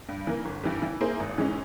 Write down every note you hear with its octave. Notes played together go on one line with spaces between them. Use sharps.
G2
E3 A#3
G1
G2 E3 G3
E3
A#3 E4 G#4 C5
G#1
G#2 E3 G#3 C#4